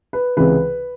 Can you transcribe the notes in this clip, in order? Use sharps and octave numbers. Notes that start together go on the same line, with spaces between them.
B4
C#2 C3 E3 G#3 B4